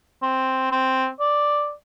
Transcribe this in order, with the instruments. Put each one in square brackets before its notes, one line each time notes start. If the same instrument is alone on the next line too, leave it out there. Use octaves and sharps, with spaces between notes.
[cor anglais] C4
C4
D5